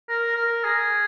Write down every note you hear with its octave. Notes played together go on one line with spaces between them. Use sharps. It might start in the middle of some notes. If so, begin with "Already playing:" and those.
A#4
A#4
G#4